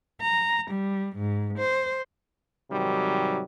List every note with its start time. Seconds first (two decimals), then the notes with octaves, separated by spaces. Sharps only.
0.22 A#5
0.71 G3
1.16 G#2
1.58 C5
2.71 G#2 C3 D#3 F#3 G3